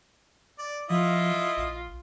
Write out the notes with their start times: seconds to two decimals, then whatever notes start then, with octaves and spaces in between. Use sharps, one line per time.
0.59 D5
0.90 F3 E4 F4 D#5
1.57 A#1